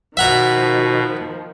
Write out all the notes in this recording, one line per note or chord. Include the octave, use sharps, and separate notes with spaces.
B2 D#3 F3 F#4 E5 F#5 A#5